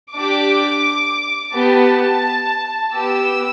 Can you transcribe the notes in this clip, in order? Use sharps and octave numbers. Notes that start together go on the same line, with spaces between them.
D4 G4 D6
B3 G4 A5
B3 G4 E6